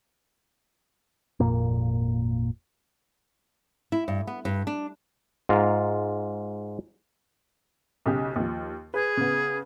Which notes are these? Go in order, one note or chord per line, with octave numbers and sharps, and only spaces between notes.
G#1 F2 A#2 A#3
E4
G2
B3
G2
D4
G#2 F4 A#5
B1 C#3 G4
D#2 F3
G#4 B4
C#3 B3